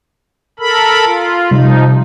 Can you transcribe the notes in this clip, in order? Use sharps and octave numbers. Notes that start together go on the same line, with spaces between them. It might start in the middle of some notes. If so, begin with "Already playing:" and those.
A4 A#4 B5
F4
C3 F3 G3 D#4